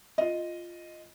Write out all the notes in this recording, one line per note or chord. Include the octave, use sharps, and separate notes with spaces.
F4 D#5